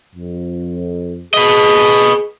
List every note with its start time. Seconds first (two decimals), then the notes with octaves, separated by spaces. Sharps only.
0.15 F2
1.34 G#4 B4 D#5